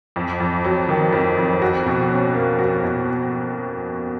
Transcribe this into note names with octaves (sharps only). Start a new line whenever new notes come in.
F2
F2
F#3
D#3
F2
F2
F#4
B2
C#4
A#3
F#4
B2